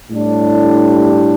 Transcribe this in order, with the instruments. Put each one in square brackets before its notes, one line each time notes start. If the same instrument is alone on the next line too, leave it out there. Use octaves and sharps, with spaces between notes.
[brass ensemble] A2 G3 D4